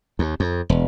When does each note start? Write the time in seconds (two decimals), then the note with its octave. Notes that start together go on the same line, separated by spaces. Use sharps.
0.19 D#2
0.40 F2
0.69 E1